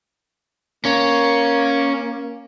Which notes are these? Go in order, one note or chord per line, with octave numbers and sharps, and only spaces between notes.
A#3 C#4